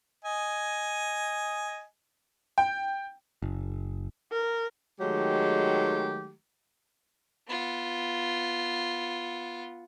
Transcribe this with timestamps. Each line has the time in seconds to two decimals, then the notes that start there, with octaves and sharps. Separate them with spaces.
0.24 D#5 G#5
2.58 G5
3.42 F#1
4.32 A#4
5.01 D#3 F#3 G#3 A3 G4
7.48 B3 F4